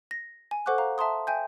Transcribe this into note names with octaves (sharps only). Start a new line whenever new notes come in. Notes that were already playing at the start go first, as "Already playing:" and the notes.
A#6
G#5
A4 C5 F#5 C#6 D6 F#6
F5 A#5
E5 A5 A#5 C6 D#6
E5 G5 G#5 G6